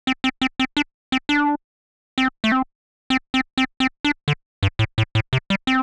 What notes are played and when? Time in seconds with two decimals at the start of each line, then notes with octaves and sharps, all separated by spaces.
0.07 C4
0.24 C4
0.42 C4
0.59 C4
0.77 D4
1.12 C4
1.29 D4
2.18 C4
2.44 A3
2.52 C4
3.10 C4
3.34 C4
3.58 C4
3.80 C4
4.05 D4
4.28 D3
4.63 G2
4.79 A2
4.98 A2
5.15 A2
5.33 C3
5.50 G3
5.67 C4